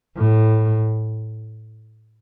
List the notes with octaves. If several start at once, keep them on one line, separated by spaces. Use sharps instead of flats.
A2